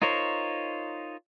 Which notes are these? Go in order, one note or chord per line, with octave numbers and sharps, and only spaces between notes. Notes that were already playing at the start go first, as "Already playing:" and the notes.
D#4 F4 A#4 C5 C#5